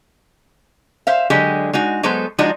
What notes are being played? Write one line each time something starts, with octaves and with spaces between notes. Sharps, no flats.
C5 E5 F5
D3 F#3 G#3 G4
G#3 D#4 F#4
F#3 G#3 B3 A4 C5
F3 G#3 D4 D#4 F#4